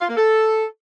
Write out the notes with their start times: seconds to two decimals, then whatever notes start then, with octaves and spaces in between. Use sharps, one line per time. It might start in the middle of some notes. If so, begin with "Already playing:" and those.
0.01 F4
0.09 A#3
0.17 A4